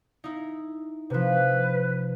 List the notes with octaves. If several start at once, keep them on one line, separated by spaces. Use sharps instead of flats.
D#4 E4
C3 F3 B4